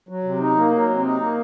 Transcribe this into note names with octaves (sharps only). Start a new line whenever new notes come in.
F#3
C3
D#4
A#3
F#3
C3
D#4
A#3